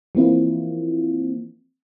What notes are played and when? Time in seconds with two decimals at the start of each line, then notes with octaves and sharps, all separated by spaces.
0.15 E3 F3 A#3 C4 E4 F4